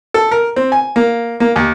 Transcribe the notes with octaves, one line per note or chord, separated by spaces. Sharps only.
A4
A#4
C4
G#5
A#3
A#3
D#2